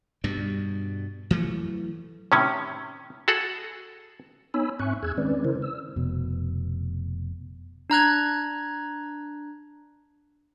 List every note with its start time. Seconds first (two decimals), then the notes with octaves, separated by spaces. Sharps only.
0.24 G2 B2 G3
1.31 E3 F#3 A3
2.32 A2 C3 D#3 C#4
3.28 F#4 G#4 A4 F#5
4.54 B3 D#4 C#5 G#5 B5 E6
4.79 G#2 C4 E5 G#5 C#6 F#6
5.03 E2 G#4 E6 F#6 G#6
5.18 D#3 G#3 C4 C#4 B4 D5
5.45 C#3 E4 A#4 C5
5.62 E6
5.96 F1 B2
7.90 D4 A#5 F#6 G#6